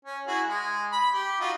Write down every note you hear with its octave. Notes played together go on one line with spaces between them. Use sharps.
C#4
E4 F#4 G#4
G#3
B5
G4
D#4 F4 F#4